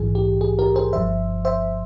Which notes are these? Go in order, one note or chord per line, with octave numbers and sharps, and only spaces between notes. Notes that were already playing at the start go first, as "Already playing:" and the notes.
Already playing: A#1 G#2 E3 G#4
G4
G#4
G4 A#4
G#4 C5
G1 G2 F3 C5 E5
C5 E5